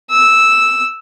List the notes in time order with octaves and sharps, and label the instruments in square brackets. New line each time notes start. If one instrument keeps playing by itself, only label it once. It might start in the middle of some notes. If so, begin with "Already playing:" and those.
[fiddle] E6